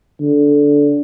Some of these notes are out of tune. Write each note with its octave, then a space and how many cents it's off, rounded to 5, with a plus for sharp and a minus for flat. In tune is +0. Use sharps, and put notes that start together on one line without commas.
D3 -15